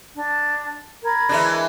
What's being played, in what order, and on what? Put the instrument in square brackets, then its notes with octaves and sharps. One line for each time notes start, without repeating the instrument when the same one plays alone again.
[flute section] D4
A#4 B5 G#6
[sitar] E3 G#3 D4